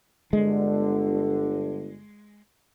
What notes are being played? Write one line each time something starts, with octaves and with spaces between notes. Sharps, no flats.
G1 D3 G#3